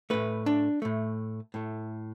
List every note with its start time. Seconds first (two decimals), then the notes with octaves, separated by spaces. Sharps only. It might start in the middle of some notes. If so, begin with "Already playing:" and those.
0.10 A2 A3 B4
0.46 D4
0.82 A2 A3
1.54 A2 A3